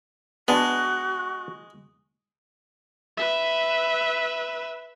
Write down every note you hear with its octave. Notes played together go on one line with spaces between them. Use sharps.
G#3 B3 D4 F#4
B4 E5